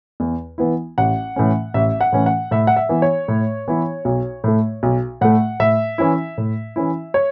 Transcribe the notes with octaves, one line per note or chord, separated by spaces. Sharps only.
E2
E3 B3 E4
A1 F#5
A2 E3 C#4
A1 E5
F#5
A2 E3 C#4
F#5
A2 E5
F#5
E5
E3 B3 E4
C#5
A2
E3 B3 E4
B1
A2 A3
B1
A2 A3 F#5
A2 E5
E3 C#4 E4
A2
E3 C#4 E4
C#5